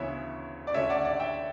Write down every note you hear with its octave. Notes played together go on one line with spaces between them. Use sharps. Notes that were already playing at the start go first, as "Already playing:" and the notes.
Already playing: D2 C#3 E3 B3 C#5 E5
D5
D2 D3 A3 C#4 C#5 E5
D5 F#5
D5 F#5
E5 G5